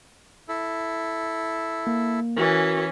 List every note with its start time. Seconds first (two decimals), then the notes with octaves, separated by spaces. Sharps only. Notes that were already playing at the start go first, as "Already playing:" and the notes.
0.49 E4 A4
1.87 A#3
2.37 E3 C#4 F#4 A#4